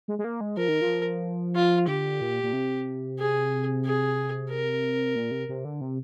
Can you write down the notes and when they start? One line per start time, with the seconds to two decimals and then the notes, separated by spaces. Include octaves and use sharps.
0.08 G#3
0.19 G#3
0.24 A#3
0.41 G#3
0.57 F3 A#4
0.68 D#3
0.81 F3
1.55 F4
1.88 D3 G4
2.21 A#2
2.43 A#2
2.53 C3
3.19 G#4
3.85 G#4
4.50 A#4
5.16 A#2
5.31 C3
5.49 C3
5.65 D3
5.81 C3